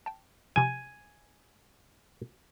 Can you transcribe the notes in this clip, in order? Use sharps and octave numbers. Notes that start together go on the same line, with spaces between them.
G5 A5
C3 F3 G#5